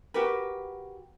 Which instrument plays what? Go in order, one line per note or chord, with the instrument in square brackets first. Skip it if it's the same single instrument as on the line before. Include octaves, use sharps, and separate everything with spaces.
[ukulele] F#4 G4 A#4 B4